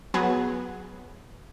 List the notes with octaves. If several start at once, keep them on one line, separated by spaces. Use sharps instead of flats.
F#3 B3 G#4